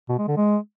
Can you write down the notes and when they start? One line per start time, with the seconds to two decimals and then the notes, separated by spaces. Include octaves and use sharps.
0.09 B2
0.18 G#3
0.28 D3
0.37 G#3